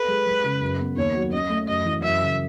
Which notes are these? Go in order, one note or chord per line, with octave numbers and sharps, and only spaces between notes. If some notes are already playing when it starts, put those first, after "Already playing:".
Already playing: A4 B4
G#3
G#3
C#3
F#2
B3
D#2 C#5
F#3
C#4 D#5
A3
F#2 D#5
E3
F#2 E5
C#3